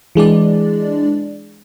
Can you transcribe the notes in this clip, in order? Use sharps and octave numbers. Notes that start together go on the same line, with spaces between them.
E3 G#3 D4 D5